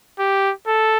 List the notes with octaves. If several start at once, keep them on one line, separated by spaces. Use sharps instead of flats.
G4
A4